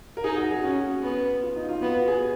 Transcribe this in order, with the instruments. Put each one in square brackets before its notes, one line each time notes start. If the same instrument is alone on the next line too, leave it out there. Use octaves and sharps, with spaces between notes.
[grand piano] A#4
[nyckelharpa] D#4 [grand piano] G#4
[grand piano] F#4
G#4
[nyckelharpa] C#4 [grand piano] F#4
[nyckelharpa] B3
[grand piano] F4
D#4
F4
[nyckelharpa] B3 [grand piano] F#4
[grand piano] F#4
G#4